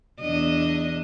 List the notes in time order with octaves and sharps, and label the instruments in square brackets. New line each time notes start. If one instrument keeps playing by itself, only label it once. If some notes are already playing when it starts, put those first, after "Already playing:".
[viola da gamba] E2 D4 D#5